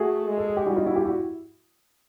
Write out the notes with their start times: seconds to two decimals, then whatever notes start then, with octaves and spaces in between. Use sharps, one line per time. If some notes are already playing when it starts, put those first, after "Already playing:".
Already playing: A3 F#4 G#4
0.28 G#3
0.38 A4
0.47 G#4
0.57 G4
0.66 G3 E4 F#4
0.76 D#4 F4
0.86 E4 F#4
0.96 F4 G4
1.05 E4 F#4